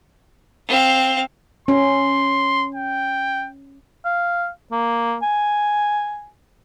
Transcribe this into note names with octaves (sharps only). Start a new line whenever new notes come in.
C4 F5
C#4 C6
G5
F5
A#3
G#5